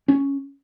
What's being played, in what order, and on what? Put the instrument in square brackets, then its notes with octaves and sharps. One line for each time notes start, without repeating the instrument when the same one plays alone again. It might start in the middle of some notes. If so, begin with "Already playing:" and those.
[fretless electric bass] C#4